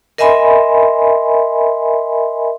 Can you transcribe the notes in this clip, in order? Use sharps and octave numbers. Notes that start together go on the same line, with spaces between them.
A#4 D#5 E5 G#5 B5 C6